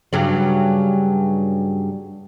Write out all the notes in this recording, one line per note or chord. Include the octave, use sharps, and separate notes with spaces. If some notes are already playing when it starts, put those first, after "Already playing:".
G2 C#3 F#3